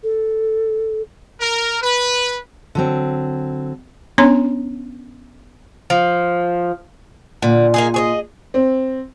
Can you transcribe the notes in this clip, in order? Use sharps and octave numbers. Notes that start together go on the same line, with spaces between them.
A4
A#4
B4
D3 F#3 C4
B3 C#4 D4 C#5 A#5 C6
F3
A#2 D3
A#3 D#4 G#4
G#4 C#5 D#5
C4